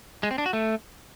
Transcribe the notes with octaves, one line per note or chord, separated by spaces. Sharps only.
G#3
C4
D4
F#4
A3